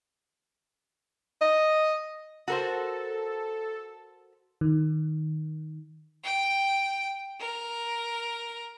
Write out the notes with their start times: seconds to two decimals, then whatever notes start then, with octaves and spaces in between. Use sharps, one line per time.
1.41 D#5
2.48 F#4 A4 A#4 C5
4.61 D#3
6.24 G5
7.40 A#4